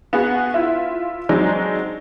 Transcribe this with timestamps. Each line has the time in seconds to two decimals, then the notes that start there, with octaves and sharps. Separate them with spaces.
0.13 B3 F#4 G#4 B4
0.54 E4 F4 E5
1.29 F#3 G#3 C4 D4 D#4